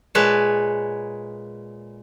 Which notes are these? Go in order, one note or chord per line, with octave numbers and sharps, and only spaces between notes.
A#2 G#3 B4 C#5 A5